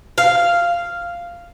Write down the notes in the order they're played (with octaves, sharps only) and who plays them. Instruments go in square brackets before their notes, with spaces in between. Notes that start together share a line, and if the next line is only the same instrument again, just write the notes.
[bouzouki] F5